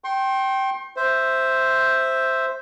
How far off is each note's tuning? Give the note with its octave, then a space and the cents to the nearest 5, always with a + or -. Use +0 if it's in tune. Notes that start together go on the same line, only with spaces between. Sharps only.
G5 -15 C6 +35
C5 +0 E5 +0